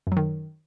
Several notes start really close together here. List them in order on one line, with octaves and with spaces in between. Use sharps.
F#2 F#3 D#3